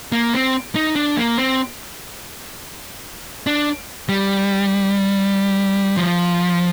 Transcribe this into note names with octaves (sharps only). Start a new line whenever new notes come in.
A#3
C4
D#4
D4
A#3
C4
D4
G3
F3